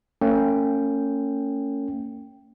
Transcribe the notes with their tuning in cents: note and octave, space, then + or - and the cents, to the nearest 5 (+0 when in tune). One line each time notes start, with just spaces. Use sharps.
A#3 -45 C#4 +0 G5 +0